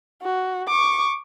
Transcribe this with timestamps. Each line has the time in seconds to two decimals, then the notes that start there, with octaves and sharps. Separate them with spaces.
0.22 F#4
0.67 C#6 D6